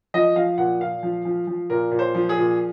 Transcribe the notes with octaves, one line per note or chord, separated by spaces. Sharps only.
F3 D#5
F3 F5
A#2 F#5
A#2 F5
F3
F3
F3
A#2 A#4
A#2
C5
F3
G#4
A#2